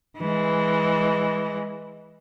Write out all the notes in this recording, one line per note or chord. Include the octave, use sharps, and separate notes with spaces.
E3 G#3